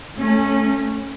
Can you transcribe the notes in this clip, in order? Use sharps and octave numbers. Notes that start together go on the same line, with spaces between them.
A3 C#4